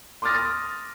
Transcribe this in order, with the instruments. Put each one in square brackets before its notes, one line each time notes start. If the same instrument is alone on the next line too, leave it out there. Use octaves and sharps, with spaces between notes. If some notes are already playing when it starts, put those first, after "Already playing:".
[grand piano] C6 D6 D#6 F6 A6 A#6